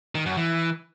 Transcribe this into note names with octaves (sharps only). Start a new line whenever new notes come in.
D#3
F#2
E3